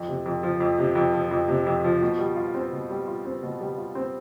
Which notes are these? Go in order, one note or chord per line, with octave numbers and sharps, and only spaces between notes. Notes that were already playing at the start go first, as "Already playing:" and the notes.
Already playing: F2
C3
F2
F3
F2
C3
F2
F3
F2
C3
F2
F3
B2
G3
F4
C4
B2
G3
F4
C4
B2
G3
F4
C4